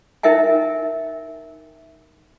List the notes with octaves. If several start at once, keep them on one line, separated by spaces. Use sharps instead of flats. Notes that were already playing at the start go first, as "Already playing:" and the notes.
D#4 A#4 E5 G5 G#5